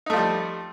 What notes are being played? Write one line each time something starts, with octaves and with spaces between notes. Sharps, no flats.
F3 G3 A3 D#4